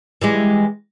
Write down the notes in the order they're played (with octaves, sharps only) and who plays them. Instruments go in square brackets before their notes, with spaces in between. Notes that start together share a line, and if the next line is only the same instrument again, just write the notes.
[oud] E3 G3 G#3